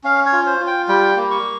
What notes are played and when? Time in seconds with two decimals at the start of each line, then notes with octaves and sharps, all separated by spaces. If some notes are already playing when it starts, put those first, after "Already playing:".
0.04 C#4 F5
0.26 C#5
0.33 F4
0.46 C5
0.60 F4
0.67 G5
0.88 G3 G5
1.17 A#3
1.31 C#6